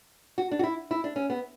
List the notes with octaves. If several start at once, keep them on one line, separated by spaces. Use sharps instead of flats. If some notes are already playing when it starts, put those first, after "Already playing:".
F#4
D4
F#4
E4
E4
D4
C#4
B3